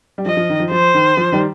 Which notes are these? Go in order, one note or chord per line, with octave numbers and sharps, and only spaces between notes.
G3
F3 D#5
F3
D#3
F3
F3 C5
D#3
F3
D#3 G3